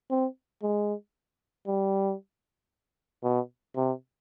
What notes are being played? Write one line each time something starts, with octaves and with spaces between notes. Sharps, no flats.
C4
G#3
G3
B2
C3